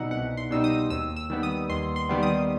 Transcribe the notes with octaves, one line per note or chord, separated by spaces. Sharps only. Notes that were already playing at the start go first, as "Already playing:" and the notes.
Already playing: C2 B2 G3 D#4 E5 F#5
C2 F#5
C6
B2 G3 D#4 E6
D#6
D#2 E6
E6
D#3 G3 B3
D#6
D#2 C6
C6
D#3 G3 B3
D#6